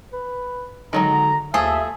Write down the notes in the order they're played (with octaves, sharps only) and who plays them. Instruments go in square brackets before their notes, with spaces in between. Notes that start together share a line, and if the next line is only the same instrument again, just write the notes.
[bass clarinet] B4
[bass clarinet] D3 [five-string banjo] D#3 F#3 G#3 [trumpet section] A#5
[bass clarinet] D#2 [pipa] F3 G#4 [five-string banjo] A3 [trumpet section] E5